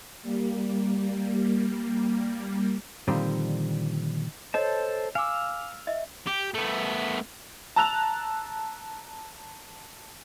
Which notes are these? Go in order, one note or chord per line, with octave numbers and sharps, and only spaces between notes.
G3 A#3
A#2 D3 D#3 F3 G3 C4
A4 C5 C#5 D#5 A5
F5 G#5 D6 E6
D#5 E5
G4
A3 B3
A5 A#5 E6 F#6 F7